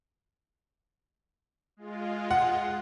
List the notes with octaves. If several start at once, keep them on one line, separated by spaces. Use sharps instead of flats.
G#3 F4
F#5